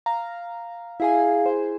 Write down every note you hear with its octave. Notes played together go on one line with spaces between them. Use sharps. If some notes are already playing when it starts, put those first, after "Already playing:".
F5 A#5
E4 G#4 F5 G#5
C5